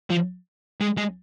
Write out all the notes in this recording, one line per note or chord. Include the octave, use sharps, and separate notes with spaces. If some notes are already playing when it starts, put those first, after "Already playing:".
F3
G#3
G#3